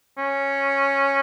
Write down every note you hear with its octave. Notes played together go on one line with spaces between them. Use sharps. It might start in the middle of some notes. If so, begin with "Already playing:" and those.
C#4